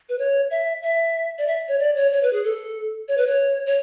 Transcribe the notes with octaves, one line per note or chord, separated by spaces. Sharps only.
B4
C#5
E5
E5
D5
E5
C#5
D5
C#5
C#5
B4
G#4
A4
C#5
B4
C#5
C#5